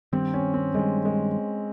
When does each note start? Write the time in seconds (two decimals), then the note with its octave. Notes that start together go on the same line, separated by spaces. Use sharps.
0.13 G2 D#3 G3 C4
0.34 C#4
0.54 C4
0.74 G2 D#3 G3 G#3
1.05 G#3